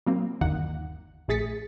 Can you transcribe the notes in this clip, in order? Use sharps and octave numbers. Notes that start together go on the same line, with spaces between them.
F#3 A#3 C4
G1 D#2 D#3 A#3 F#5
A#1 A3 G#4 A6 B6 C#7